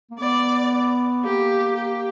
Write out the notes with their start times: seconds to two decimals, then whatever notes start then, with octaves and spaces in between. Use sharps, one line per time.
0.11 A#3
0.19 B3 D5
1.24 A#3 G4
1.76 G4